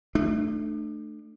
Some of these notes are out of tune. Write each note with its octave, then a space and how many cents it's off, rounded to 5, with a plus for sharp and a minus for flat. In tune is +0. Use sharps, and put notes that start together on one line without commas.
A3 +0 D4 +35